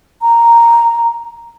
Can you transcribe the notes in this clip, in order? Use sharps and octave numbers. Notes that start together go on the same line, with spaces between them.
A#5